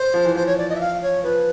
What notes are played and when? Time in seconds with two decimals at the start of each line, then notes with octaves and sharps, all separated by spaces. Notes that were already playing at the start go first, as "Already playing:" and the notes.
Already playing: C5
0.14 F3
0.25 E3
0.36 F3 C5
0.46 C#5
0.58 D5
0.69 D#5
0.75 E5
0.80 F5
1.02 C#5
1.23 F3 B4